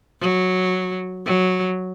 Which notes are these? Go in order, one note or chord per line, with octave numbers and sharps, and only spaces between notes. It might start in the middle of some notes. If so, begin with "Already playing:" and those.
F#3
F#3